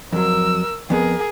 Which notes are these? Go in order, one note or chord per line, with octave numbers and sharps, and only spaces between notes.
F2 F#3 A#4 E6
F2 B3 G#4 A#4